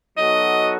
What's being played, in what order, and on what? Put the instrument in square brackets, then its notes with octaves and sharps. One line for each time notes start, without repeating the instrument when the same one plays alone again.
[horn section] F#3 B3 D#4 F#4 A4 [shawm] D#5